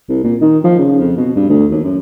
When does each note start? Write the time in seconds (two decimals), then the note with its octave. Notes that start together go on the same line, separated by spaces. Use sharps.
0.09 C2
0.24 A#2
0.42 D#3
0.64 F3
0.79 C#3
1.00 F2
1.17 B2
1.36 G2
1.50 D2
1.71 D#2
1.84 F#2